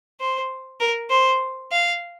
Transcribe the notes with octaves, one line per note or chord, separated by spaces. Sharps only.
C5
A#4
C5
F5